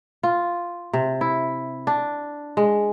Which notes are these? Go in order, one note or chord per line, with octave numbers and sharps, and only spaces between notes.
F4
C3
E4
D4
G#3